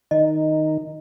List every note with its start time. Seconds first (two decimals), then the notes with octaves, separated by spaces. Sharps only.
0.11 D#3 D#5